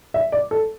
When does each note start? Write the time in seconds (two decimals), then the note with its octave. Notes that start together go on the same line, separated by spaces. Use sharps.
0.14 E5
0.32 D5
0.51 A4